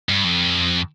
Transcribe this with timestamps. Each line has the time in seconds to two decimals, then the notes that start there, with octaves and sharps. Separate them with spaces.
0.09 G2
0.24 F2